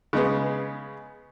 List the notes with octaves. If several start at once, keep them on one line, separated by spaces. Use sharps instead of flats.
C#3 G#3 B3